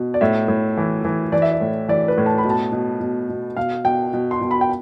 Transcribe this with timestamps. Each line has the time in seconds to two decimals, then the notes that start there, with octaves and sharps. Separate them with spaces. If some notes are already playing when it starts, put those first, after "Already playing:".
Already playing: B2
0.14 D5
0.21 A2 E5
0.48 A2
0.77 E3
1.05 E3
1.32 E3 D5
1.42 E5
1.52 D5
1.61 A2
1.89 E3 D5
2.08 B4
2.18 A2
2.26 A5
2.38 B5
2.45 B2
2.50 A5
2.72 B2
3.00 B2
3.29 B2
3.57 B2 F5
3.85 B2 G5
4.13 B2
4.31 C6
4.41 B2
4.51 B5
4.61 G5